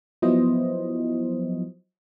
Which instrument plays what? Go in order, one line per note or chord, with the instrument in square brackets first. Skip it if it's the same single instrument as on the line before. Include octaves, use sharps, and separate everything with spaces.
[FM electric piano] F3 F#3 B3 E4 C5 D#5